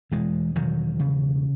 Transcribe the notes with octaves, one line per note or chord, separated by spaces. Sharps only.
E1 E3 G#3
E1 D#3 F#3
C#3